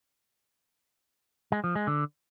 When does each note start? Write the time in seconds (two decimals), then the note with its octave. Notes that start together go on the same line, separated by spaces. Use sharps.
1.52 G#3
1.64 F3
1.75 G#3
1.87 D3